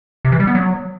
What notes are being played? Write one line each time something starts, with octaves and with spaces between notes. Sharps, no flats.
C3
E3
G3
B3
F#3